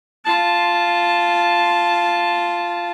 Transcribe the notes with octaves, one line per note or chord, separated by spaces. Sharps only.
F4 A5